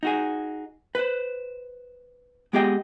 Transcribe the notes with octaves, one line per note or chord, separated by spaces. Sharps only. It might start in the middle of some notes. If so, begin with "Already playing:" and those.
D#4 F#4 G#4
B4 C5
G#3 B3 G4 G#4 D#5 G5